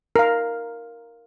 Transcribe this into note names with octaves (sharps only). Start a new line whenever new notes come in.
A#4 F5